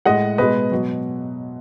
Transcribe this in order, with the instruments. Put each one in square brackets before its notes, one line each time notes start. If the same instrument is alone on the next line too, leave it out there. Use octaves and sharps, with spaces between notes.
[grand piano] A2 G#3 D#5 F#5
B2 G#3 B4 D#5
B2 F#3